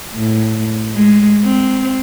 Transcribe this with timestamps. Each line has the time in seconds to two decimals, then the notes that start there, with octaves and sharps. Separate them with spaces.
0.15 A2
0.94 G#3
1.45 C4